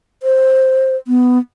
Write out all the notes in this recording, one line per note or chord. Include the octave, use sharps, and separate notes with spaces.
C5
B3